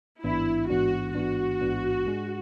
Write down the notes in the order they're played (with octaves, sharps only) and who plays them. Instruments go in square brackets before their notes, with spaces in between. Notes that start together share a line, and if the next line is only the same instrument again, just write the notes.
[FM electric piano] A1 G#2 E3 B3 D4 [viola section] E4
[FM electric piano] A1 G#2 E3 B3 D4 [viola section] F#4
[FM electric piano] A1 G#2 E3 B3 D4 [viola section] F#4
[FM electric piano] A1 G#2 E3 B3 D4
G#2 G#3 D4 G#4